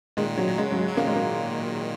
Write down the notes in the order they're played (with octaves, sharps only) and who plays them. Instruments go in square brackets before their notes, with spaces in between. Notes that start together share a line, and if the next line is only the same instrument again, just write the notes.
[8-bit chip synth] A#2 D#3 [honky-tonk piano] G#3
[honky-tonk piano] F#3
[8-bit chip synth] A#2
[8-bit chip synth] C#3 [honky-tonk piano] G#3
[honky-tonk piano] F#3
G#3
[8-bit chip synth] F#3
[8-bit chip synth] A#2 D#3 [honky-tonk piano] A#3
[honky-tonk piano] G#3
A#3